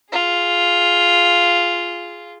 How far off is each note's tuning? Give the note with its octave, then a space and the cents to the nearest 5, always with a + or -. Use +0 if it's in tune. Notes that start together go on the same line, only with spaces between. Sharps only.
F4 +0 G#4 +0